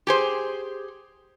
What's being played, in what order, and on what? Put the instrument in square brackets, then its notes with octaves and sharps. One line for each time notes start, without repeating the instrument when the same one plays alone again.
[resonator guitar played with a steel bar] G4 G#4 C5